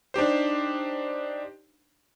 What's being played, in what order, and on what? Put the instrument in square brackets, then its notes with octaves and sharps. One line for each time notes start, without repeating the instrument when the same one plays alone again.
[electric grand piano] D4 D#4 G4 C5